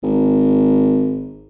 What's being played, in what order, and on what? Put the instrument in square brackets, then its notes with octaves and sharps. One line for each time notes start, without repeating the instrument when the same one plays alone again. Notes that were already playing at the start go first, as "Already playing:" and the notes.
[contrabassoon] G#1